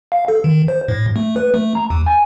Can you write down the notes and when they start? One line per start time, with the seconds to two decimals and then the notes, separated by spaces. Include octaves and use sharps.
0.12 F5
0.28 A4
0.44 D#3
0.68 C5
0.88 A2
1.16 A3
1.36 B4
1.54 A3
1.75 A#5
1.90 D#2
2.06 G#5